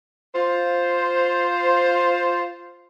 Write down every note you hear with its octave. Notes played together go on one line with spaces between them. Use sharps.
F4 C5